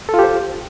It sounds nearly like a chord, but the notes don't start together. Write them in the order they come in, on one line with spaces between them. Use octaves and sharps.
A4 F4 G4 C5